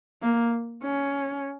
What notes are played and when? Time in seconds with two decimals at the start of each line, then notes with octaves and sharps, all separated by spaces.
0.22 A#3
0.83 C#4